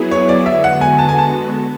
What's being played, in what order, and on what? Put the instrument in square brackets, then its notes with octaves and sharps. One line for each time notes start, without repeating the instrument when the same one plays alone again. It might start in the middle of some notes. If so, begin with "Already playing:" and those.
Already playing: [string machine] F#3 B3 E4 G#4
[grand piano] C#5
D5
[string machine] D3 G#3 B3 F#4 [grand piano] E5
[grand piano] F#5
G#5
A5
G#5
A5